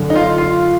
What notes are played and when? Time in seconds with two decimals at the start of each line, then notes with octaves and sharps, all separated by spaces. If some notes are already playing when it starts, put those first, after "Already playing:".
Already playing: F#2 D3
0.10 D#4
0.15 F4
0.38 F4